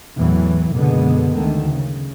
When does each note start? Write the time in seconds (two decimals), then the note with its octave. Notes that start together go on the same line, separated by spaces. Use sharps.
0.18 E2 A2 E3 F#3
0.73 F#1 F#2 B2 D3 G#3 B3
1.35 D2 D3 D#3
1.71 C#3